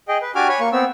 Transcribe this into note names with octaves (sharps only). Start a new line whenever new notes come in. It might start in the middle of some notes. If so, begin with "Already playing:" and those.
G#4 D#5 G5
B4
D4 F#4 G4 G#5 D6 F6
C#5 G#5 B5
A#3 C#6
B3 C4 E6